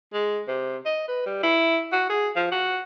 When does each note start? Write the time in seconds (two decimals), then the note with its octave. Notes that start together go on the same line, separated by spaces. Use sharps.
0.13 G#3
0.48 C3
0.86 D#5
1.08 B4
1.26 G3
1.43 E4
1.93 F#4
2.10 G#4
2.36 F3
2.52 F#4